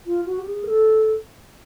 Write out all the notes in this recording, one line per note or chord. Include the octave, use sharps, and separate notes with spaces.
F4
F#4
G4
G#4
A#4
A4